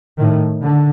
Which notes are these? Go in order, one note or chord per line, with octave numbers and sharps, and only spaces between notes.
A2 D#3
D3